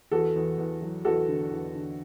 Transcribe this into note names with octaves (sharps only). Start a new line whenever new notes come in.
E2 F#4 A4
E2
E2
F#3
E2 F#4 A4
D3
E2
D3